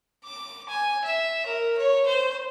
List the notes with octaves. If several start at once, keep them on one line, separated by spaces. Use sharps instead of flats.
D6
G#5
E5
A#4
C#5
C5